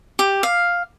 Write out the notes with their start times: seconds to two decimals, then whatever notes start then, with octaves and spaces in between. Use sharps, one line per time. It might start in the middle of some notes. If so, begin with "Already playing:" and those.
0.19 G4
0.43 F5